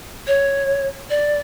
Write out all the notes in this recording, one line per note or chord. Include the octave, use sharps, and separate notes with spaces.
C#5
D5